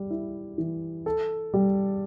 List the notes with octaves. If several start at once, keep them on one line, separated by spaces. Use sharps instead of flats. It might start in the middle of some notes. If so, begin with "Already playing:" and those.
Already playing: G3
E4
E3
A4
G3